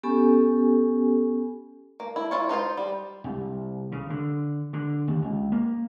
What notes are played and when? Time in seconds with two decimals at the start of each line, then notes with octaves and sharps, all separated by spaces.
0.03 B3 C#4 G4 A4 G#5
2.00 A#3
2.16 E4
2.31 E4 F4 C#5
2.49 D#4 F4 F#4 C5
2.77 G3
3.24 C2
3.92 C#3
4.10 D3
4.73 D3
5.08 D#2
5.22 C#2
5.52 A#3